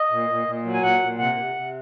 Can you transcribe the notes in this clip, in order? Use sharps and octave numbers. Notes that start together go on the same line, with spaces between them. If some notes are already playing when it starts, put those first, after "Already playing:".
Already playing: D#5
A#2
A#2
A#2
F#3
G#5
A#2 F#5
A#2
C3 F#5
C3
C3